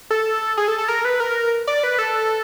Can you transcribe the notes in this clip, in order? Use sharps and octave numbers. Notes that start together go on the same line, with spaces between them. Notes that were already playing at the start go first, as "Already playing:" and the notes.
A4
G#4
A4
A4
A#4
B4
A#4
D5
B4
A4